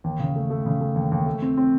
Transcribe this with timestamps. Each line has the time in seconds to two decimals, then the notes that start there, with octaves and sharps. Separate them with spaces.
0.04 D#2
0.19 C#3
0.36 A3
0.50 A3
0.66 C#3
0.81 A3
0.96 D#2
1.12 D#2
1.26 A3
1.42 C4
1.57 C4